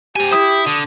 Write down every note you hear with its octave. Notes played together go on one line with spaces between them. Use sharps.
G4 C5 G#5
E4 D#6
D3